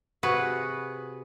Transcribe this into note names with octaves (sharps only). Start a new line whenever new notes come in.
C3 F#4 G#4 B4